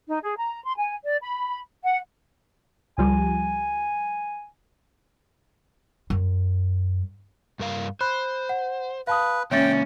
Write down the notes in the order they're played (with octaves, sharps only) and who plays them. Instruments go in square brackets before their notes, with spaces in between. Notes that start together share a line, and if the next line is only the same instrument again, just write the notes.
[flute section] D#4
G#4
A#5
C6
G#5
D5
B5
F#5
[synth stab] C#2 F3 G3 [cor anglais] G#5
[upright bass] F#2
[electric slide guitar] G2 A#4 F5
[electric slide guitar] C5 [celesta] B5 F#6
[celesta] F#5
[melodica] B4 [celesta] F5 A5 D#6
[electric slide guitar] C#3 G#3 A#3 [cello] C#4 [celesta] C#5 E5 A6 [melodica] G5